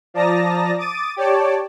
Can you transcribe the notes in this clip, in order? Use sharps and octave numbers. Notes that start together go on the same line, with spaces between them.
F3 D5 A5 A#5 D#6 A#6
D6 D#6 A6 D#7
G4 C#5 D5 A5 D6